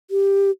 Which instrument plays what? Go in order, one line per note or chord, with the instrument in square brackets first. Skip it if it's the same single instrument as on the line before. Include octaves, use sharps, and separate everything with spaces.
[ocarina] G4